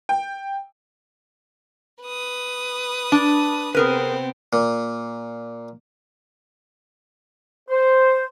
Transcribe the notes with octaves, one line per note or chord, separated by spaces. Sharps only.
G5
B4 D#6
D4
C3 B3 C4 G#4 A#4 B4
A#2
C5